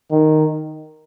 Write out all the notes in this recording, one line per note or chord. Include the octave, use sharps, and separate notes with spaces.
D#3